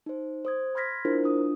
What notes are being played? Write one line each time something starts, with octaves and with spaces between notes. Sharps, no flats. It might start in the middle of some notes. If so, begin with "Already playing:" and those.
D#4 C5
C5 D#6 G#6
B5 C6 F6 G#6 A#6 B6
D4 E4 F4 A#4 C5
D4 F4 D#6